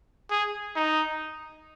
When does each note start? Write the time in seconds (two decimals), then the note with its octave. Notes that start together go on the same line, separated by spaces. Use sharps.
0.30 G#4
0.76 D#4